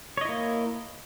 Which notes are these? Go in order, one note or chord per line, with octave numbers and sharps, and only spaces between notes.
A#3 E4 C#5 D#5